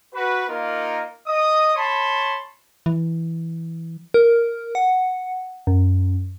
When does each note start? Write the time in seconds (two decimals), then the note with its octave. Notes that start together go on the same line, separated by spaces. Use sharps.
0.14 F#4 B4
0.48 A#3 D#4 F4 A#4
1.26 D#5 D#6
1.75 C#5 A5 B5 C6
2.86 E3
4.14 A#4
4.75 F#5
5.67 F#2